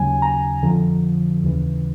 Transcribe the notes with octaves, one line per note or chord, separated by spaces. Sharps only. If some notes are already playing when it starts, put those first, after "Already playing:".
Already playing: D#2 C#3 F#3 G#5
A#5
F2 D3 F3
D#2 C#3 E3